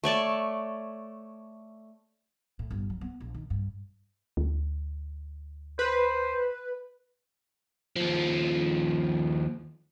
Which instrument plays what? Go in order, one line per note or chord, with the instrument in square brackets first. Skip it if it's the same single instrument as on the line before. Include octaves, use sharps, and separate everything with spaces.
[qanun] A3 C#5 D5 A5
[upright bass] A2
G1
F#3
B3
A#1
D#3
G2
[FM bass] D2
[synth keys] B4 [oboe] C5
[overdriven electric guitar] D#2 F3